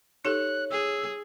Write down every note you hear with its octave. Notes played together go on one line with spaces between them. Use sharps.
D#4 G4 A4 C#5 F#6
G#4 E6